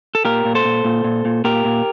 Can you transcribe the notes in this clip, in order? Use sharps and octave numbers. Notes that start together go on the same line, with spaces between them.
A4
A#2 G4 A#4
A#2
A4 C5
A#2
A#2
A#2
A#2
A#2 G4 A#4
A#2